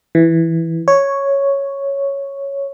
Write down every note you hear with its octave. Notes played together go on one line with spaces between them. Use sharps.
E3
C#5